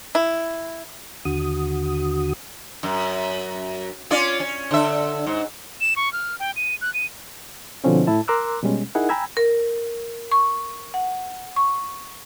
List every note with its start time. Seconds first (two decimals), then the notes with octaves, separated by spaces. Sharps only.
0.15 E4
1.25 D#2 D3 F#4 D#6
2.83 F#2
4.11 C#4 F4 D5
4.40 C#4
4.71 D3 E5
5.26 G#2
5.81 E7
5.96 C#6
6.13 F6
6.40 G5
6.56 D#7
6.81 F#6
6.94 D#7
7.84 B2 D3 F3 C4 C#4 D#4
8.07 A2 E4 A5
8.28 A#4 A#5 C6 D6 E6 F#6
8.62 B2 G3 G#3 C#4
8.95 D#4 E4 G#4 A#4 F#5
9.09 G5 G#5 A#5 B5 E6 G#6
9.37 A#4
10.31 C#6
10.94 F#5
11.56 C#6